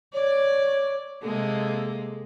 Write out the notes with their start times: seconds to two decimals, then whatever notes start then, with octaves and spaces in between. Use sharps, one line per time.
0.14 C#5 D5
1.22 C3 G#3 A#3 A4